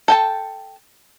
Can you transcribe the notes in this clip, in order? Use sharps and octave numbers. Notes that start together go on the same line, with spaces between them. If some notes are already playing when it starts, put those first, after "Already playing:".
A4 G5 A5